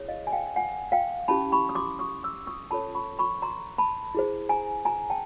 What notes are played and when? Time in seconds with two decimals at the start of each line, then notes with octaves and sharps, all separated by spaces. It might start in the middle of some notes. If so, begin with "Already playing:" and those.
Already playing: E4 G#4 C#5
0.09 D#5 F5
0.27 G#5
0.32 F5 G5
0.56 F#5 G#5
0.92 F5 G5
1.28 C#4 E4 G4 A5 B5
1.52 B5 C#6
1.69 D#6
1.75 C6 D6
1.99 C#6 D#6
2.23 D6 E6
2.47 C#6 D#6
2.71 C#4 F4 A4 C#5 A5 B5
2.95 B5 C#6
3.19 B5 C#6
3.42 A#5 C6
3.78 A5 B5
4.15 E4 G#4 C5
4.49 G#5 A#5
4.85 G#5 A#5
5.10 G5 A5